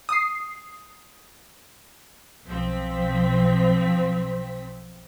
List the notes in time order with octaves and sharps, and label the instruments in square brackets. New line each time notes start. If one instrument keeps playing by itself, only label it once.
[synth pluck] D#6 C7
[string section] B1 F3 C4 B6